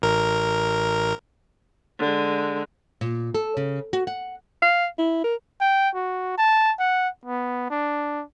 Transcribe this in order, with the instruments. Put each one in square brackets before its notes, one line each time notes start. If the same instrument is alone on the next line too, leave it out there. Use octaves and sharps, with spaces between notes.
[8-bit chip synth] A1 A#4
[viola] D3 G#3
[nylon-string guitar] A#2
A4
C#3
F#4
F#5
[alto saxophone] F5
E4
A#4
[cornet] G5
F#4
A5
F#5
B3
D4